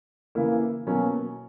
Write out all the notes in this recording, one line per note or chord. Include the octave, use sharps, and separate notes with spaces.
C#3 E3 A#3 E4
B2 F#3 A#3 C#4